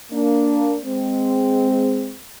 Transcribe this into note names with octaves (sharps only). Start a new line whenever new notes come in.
A#3 D4
G#3 C4